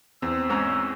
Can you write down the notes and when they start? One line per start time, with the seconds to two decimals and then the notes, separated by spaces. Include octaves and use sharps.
0.22 E2 C4 E6
0.50 G#2 C#4 A#5